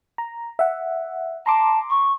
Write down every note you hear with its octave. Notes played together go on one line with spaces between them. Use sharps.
A#5
E5 F#5
A5 A#5 C6 D6
C#6